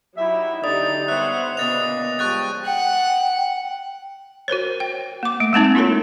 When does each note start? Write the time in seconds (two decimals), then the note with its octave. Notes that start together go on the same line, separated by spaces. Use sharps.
0.17 F#3 D#4 E4 F#4 G4 E5
0.64 D3 D#4 G4 D5 D#6
1.08 G3 B3 C5 C#5 E5 F#5 F#6
1.57 A#2 C#3 B3 D4 D#5 D#6 A6 F7
2.19 F3 G3 G#3 G5 C#6 F#6 A6
2.66 F#5 G5
4.48 F#4 A#4 C5 C#5
4.80 G5
5.23 A#3 D6
5.40 A3
5.53 G#3 A#3 C4 D#4
5.75 E4 F4 A4 A#4 C#5